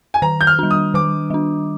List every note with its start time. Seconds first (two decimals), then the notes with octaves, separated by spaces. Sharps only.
0.14 G#5
0.22 D#3 A#5
0.41 G6
0.47 F6
0.59 G3 D4
0.71 D#6
0.94 D#3 D6
1.30 G3 D4